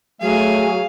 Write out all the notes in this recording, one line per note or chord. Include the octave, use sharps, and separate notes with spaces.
F#3 A3 G#4 F5